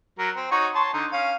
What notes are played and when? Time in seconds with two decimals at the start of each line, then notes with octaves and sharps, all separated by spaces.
0.19 F#3 A#4
0.37 C4
0.51 D#4 F#4 C#5
0.75 C#5 A5 C6
0.94 D3 D#4
1.13 C#4 F5